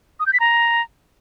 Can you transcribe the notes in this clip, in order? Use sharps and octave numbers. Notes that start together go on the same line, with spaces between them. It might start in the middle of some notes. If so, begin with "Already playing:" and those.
D#6
G6
B6
A#5